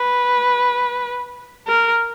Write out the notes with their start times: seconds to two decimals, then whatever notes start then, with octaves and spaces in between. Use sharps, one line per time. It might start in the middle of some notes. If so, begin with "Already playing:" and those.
Already playing: B4
1.68 A#4